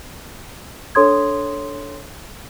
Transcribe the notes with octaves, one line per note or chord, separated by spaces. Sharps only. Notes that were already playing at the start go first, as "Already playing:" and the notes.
D4 A4 C#5 C6 D#6 G#6